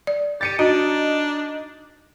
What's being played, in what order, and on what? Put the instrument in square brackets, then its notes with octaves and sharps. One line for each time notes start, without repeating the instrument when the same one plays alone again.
[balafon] D5
[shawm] G4 [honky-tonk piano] A6 C#7 D#7
[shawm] D4 [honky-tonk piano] D#4 [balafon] F#4